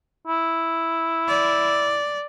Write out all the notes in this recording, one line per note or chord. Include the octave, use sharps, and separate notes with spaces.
E4
D5